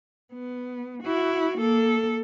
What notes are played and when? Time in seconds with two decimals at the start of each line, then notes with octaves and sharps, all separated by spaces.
0.34 B3
1.02 E4 F#4
1.58 A#3 A4